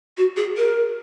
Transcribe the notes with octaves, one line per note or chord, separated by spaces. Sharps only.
F#4
G#4
A#4